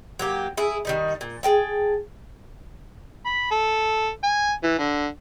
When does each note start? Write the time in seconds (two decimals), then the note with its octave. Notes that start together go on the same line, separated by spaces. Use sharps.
0.19 F#3 A#3 G4
0.57 E4 G#4
0.85 D#3 G3 D#4
1.21 A#2
1.43 G#4 A4 G5 A5
3.26 B5
3.51 A4
4.24 G#5
4.64 E3
4.79 D3